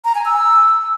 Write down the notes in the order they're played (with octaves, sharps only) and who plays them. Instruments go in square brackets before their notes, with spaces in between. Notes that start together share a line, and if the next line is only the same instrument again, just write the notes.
[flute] A#5
G#5
E6